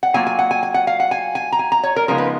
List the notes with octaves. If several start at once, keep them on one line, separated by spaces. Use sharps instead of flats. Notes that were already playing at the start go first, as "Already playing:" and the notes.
F#5
F#3 A#3 F4 G#5
G#5
F#5
G#5
G#5
F#5
F5
F#5
G#5
G#5
A#5
G#5
A#5
C#5
A#4
C#3 F3 G#3 B3 D#4 A#4
B4